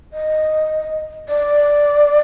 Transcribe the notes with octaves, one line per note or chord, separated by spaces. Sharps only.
D#5
D5